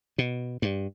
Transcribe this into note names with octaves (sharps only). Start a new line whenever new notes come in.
B2
G2